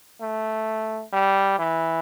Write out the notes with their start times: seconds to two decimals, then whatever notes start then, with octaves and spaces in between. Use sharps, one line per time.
0.21 A3
1.13 G3
1.59 E3